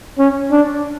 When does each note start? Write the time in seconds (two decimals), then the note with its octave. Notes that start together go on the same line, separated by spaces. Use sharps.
0.19 C#4
0.51 D4